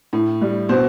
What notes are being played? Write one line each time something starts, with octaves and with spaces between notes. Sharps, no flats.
A2
G3
B2 C5